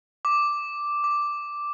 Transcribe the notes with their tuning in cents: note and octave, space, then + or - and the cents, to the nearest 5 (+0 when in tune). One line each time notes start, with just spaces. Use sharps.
D6 +0
D6 +0